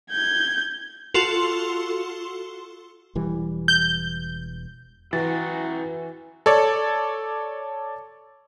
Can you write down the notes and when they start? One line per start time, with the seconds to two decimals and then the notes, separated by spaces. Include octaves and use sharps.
0.11 G6 G#6
1.14 F4 F#4 A4 C6
3.15 E1 E3 G3
3.68 G6
5.13 E3 E4 F#4 G5 A#5 A6
6.46 A4 C#5 D5